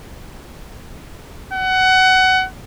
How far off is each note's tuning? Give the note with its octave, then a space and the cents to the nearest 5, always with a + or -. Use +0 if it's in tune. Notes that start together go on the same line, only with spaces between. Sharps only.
F#5 +20